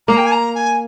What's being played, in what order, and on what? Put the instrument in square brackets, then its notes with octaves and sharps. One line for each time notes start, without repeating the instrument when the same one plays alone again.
[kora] A#3 [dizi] A#5
[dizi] G5
G#5
A#5
G#5